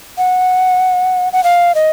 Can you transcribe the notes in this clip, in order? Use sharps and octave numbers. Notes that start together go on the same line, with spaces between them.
F#5
F#5
F5
D#5